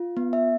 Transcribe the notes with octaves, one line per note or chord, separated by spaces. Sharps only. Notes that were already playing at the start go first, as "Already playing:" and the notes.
Already playing: F4
B3
E5